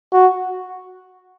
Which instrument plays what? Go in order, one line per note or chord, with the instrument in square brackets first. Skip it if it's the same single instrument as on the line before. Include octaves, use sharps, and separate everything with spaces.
[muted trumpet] F#4